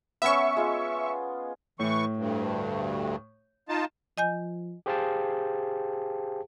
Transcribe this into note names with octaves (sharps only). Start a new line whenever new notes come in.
B3 C#4 E5 C#6
G#3 F4
A2 E3 C#6
D2 G2
D#4 F4 A5
F3 D#5 G#5 G6
G4 G#4 C5 F5 G5 A5